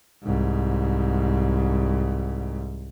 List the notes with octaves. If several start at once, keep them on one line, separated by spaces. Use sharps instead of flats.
C2 G#2